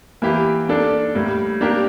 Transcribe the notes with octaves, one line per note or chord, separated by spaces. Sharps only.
E3 A#3 E4 G4
A#3 D4 A4 D5
A2 G3 A#3
A#3 D4 G4 A#4